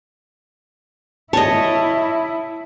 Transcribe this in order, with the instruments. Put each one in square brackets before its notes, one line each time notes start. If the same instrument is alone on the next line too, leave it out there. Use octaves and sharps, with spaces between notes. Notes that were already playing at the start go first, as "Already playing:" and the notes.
[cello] E4 [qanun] C#5 D#5 [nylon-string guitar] A5